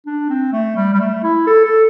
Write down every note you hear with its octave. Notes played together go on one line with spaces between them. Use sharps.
D4
C4
A3
G3
G3
A3
E4
A4
A4